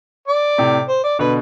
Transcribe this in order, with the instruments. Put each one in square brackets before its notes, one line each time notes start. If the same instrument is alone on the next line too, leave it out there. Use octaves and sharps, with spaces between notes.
[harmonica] D5
[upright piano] A2 C3
[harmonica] C5
D5
[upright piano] B2 D3 [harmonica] B4